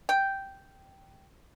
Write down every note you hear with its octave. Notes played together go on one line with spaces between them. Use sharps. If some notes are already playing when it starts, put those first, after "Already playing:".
G5